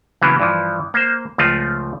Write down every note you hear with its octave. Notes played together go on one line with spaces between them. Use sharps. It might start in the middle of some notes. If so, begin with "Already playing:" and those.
C#3 E3 F#3 A#3 B3
G2 E3 F3
A#3 C5
C#2 F3 A3 F4 D#5